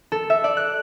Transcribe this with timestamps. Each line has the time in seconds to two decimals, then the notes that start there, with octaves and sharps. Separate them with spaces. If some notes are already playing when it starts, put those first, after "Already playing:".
0.12 A4
0.30 E5
0.44 D5
0.57 F#6